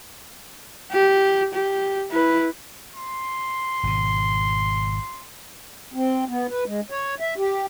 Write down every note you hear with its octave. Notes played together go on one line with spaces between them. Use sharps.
G4
G4
E4 B4
C6
G#1 B2
C4
B3
B4
G#3
C#5
E5
G4